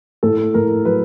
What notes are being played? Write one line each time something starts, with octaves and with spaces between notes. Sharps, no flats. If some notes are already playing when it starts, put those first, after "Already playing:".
A2 A4
A2 A#4
F#3 B4